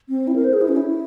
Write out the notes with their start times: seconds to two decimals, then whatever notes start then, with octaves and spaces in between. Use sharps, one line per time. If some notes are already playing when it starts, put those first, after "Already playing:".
0.09 C4
0.28 E4
0.36 A#4
0.44 C5
0.53 G#4
0.61 E4
0.68 C#4
0.77 E4